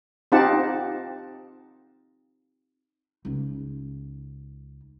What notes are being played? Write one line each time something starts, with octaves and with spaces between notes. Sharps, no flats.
C4 D#4 F4 G4 F#5 A5
C#2 D#4